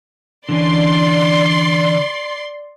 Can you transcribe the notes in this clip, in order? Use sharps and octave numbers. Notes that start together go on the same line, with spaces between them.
D3 E3 C#4 D5 C6